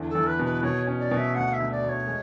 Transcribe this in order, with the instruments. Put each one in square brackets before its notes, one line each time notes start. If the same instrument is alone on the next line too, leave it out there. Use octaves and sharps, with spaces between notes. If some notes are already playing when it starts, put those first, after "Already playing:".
Already playing: [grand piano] E2 D3
[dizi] A4
[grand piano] E2
[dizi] B4
[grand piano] B2
[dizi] B4
[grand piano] B2 [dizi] C#5
[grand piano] C#4
[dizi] D5
[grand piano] B2
[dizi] E5
[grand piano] D2 [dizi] F#5
[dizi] E5
[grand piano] D2
[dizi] D5
[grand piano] D2
[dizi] C#5
[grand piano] G#3